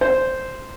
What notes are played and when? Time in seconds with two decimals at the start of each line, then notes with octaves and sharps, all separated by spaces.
0.01 C5